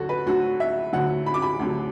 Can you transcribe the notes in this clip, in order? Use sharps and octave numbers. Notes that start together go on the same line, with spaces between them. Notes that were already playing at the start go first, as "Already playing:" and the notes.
Already playing: D2 D3 F#3 F#4 A4
B4
D2 D3 F#3 F#4
E5
D2 D3 F#3 F#5
B5
D6
B5
D2 D3 F#3